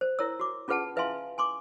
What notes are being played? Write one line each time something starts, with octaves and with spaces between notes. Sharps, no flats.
C5
E4 A#4 C#5 E6
F#4 D6
C#4 F4 G#4 B4 F#5 A5
E4 B4 E5 F5 G#5 C6
G#5 C6 D6